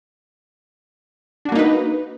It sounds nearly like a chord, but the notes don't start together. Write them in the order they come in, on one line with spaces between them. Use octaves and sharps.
D4 F#4 A#3 D#4 B4